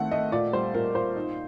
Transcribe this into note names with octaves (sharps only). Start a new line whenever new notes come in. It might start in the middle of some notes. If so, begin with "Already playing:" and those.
Already playing: D#3 A3 C4 F#5
A3 D#5
A#2 D5
G3 C5
A#2 A#4
A#2 C5
D#4